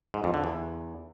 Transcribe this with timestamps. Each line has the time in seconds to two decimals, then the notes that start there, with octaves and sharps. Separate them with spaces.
0.14 G#2
0.24 F2
0.34 D3
0.44 E2